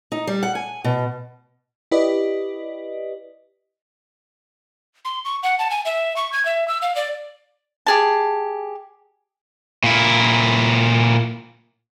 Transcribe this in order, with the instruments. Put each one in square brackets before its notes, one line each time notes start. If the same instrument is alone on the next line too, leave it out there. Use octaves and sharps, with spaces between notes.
[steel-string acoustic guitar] D#4
G3
F#5
G#5
B2
[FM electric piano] E4 G4 B4 D5 D#5
[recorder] C6
C#6
F#5
A5
G#5
E5
C#6
G#6
E5
E6
F5
D5
[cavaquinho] G4 G#4 A5
[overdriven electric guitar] A#2 E4